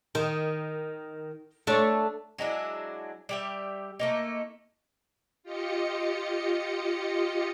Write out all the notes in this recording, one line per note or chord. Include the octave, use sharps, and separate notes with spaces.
D#3
A3 D4 C#5
F#3 G#3 D4 E4
G3 G4 E5
A3 A#3 D#4
F4 G4 D#5 C#7